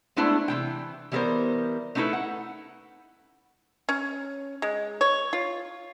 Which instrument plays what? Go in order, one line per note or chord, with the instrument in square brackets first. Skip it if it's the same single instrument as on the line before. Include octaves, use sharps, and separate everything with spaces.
[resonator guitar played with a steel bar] G#3 A3 B3 D4 E4 C5
C3 E3 G5
E3 G3 B3 F#4 A#4 C5
A3 C#4 D#4 E4 A4 B4
F#5
[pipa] C#4
G#3
C#5
F4